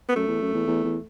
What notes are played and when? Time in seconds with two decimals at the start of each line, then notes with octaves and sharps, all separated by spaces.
0.09 B3
0.15 F#2 A3
0.28 E2
0.41 F#2
0.54 E2
0.67 E2
0.84 E2